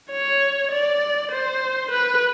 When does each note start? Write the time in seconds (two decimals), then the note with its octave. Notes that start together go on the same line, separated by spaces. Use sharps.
0.11 C#5
0.71 D5
1.31 C5
1.91 B4